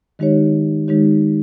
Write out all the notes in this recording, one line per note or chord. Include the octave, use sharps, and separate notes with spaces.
D#3 G#3 D#4 G4 C#5
D#3 G#3 D#4 G4 C#5